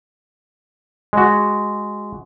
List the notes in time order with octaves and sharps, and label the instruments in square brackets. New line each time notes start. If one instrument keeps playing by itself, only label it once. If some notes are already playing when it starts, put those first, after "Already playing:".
[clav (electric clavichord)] G#3 F#4